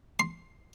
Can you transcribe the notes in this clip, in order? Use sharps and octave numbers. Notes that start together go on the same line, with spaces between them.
C6